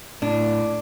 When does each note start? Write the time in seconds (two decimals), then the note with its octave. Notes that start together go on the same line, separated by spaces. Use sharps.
0.22 A2 D4